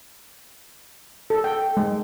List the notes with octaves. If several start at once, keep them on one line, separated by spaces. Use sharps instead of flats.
A4
G5
G#3